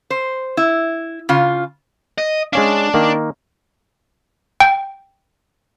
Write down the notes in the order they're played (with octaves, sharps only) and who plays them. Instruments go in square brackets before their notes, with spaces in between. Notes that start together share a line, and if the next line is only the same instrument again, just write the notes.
[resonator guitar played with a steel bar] C5
E4
C#3 F4
[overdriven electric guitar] D#5
[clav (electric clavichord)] G#3 C#4 F5 [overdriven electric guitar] D4
[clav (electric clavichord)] D#3 A#3
[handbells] G5